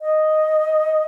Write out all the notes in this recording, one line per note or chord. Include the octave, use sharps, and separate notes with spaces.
D#5